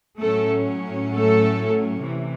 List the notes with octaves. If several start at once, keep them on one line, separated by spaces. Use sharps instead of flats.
A2 F#3 A3 C#4 A4
A3 A4
C3 E3